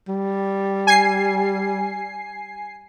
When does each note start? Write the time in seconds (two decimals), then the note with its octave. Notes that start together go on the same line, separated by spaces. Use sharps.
0.08 G3
0.87 G#5 C7